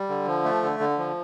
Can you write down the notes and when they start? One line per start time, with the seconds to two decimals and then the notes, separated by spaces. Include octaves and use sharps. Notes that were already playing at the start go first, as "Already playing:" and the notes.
Already playing: G3
0.09 D3
0.27 F3
0.44 A3
0.63 D3
0.80 D3
0.98 F3